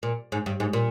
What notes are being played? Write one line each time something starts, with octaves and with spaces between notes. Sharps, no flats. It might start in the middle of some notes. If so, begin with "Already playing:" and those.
A#2
G#2
G2
G#2
A#2